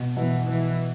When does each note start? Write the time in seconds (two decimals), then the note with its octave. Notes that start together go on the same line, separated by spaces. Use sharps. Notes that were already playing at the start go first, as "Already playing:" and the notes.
Already playing: B2
0.17 B2 E3
0.48 E3